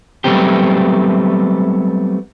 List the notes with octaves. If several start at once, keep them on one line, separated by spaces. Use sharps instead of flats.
F#3 G3 A3 B3 C4 G4